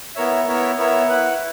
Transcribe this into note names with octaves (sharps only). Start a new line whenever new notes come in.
B3 E4 A#4 C#5 E5
B3 E4 A#4 C#5 E5
B3 E4 A#4 C#5 E5
E4 B4 F#5